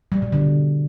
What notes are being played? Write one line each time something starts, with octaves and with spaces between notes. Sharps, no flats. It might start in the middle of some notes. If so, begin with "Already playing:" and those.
G3
B2
D3